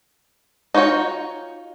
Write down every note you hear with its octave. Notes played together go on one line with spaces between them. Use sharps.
D#4 F4 F#4 C#5 G5